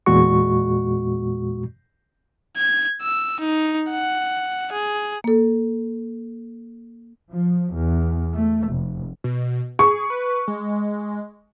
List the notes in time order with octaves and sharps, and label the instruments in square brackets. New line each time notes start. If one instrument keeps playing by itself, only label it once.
[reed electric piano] E2 A#2 G#3 F#4 C#6
[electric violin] G#6
E6
D#4
F#5
G#4
[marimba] A#3 A4
[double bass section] F3
E2
A3
F1
[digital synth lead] B2
[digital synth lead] G#4 [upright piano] C#6
[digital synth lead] B4
G#3